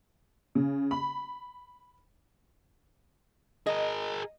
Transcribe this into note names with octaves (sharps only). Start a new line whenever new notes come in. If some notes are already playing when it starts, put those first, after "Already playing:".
C#3
B5
G#4 A#4 D#5